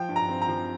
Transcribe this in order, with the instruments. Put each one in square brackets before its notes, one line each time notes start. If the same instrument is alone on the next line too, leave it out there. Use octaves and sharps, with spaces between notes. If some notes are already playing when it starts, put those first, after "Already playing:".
Already playing: [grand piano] F3 [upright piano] G5
[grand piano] G2
[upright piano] A#5
[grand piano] C4
[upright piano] A#5
[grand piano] F3